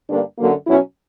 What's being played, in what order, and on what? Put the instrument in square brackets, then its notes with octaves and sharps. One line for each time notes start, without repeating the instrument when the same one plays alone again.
[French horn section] G2 D3 A#3 D4
F#2 D3 F#3 A#3
B2 F#3 C#4 E4